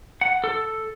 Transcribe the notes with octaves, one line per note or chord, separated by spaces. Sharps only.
F#5
A4